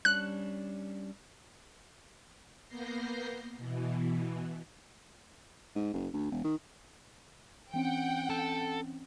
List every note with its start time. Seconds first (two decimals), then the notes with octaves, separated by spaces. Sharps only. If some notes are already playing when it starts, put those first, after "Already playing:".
0.05 G3 C#4 D4 F#6
2.67 A#3 B3 G6 A#6 C7
3.57 B2 E3
5.76 G#2
5.94 F#1
6.14 D2
6.31 E1
6.44 D#3
7.74 E3 C4 C#4 F#5 G5
8.30 A4